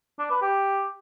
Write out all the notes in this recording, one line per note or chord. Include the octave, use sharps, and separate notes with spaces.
D4
B4
G4